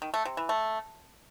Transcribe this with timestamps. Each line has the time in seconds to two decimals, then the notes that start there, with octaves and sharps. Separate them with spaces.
0.02 D#3
0.14 A3
0.25 C3
0.37 E3
0.49 A3